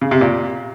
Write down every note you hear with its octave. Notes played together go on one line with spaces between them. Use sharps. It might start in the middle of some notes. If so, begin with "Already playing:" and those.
C#3
C3
A#2